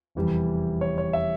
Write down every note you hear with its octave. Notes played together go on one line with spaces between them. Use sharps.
F1 E2 E3 G3
C#5
C#5
E5